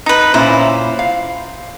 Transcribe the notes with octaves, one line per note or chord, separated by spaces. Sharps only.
D#4 B4
A#2 C#4 E4 C5
F5